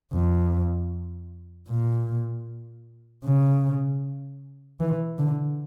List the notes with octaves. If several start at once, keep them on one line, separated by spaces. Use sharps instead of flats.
F2
A#2
C#3
E3
D3